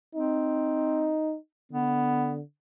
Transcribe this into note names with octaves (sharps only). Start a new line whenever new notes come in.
C4 D#4
D3 B3